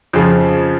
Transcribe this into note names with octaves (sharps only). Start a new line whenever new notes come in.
F2 C#3 F3